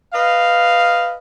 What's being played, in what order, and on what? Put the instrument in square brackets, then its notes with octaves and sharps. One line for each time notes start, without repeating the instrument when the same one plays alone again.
[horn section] B4 D#5 F5